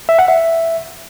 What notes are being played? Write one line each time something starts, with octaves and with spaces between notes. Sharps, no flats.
E5
F#5
E5